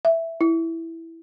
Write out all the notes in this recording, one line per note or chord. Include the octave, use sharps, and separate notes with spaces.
E5
E4